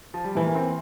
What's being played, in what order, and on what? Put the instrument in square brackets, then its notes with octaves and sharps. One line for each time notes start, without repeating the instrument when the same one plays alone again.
[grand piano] F3
G3
[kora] E3 [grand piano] A3
[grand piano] A#3
C4